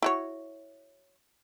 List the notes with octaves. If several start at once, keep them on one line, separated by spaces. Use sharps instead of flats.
E4 F#4 C#5